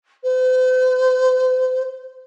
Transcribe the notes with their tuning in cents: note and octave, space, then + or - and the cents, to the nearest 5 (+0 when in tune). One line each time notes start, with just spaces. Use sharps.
C5 -40